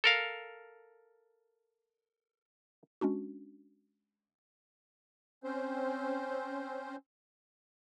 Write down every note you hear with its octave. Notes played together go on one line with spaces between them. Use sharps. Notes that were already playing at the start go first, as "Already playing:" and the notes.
A4 A#4 F5
G#3 C#4 D4 F#4
C4 C#4 C5